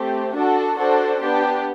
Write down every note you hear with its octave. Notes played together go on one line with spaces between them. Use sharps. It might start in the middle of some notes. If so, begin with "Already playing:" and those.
Already playing: A3 C4 G4
D4 F#4 A4
D4 F#4 A4 C5
B3 D4 G4